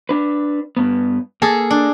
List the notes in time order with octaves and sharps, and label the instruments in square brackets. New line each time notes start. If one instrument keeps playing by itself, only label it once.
[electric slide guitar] D4 B4
G2 B3
[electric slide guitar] A#3 [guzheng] G#4 A4 A5
[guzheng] D4